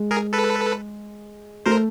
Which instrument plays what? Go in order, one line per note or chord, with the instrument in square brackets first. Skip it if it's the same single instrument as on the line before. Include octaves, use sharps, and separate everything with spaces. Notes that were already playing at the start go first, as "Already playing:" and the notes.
Already playing: [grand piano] G#3
[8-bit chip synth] G#4 A#4
A4 B4
[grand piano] A3 [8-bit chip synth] A#4 C5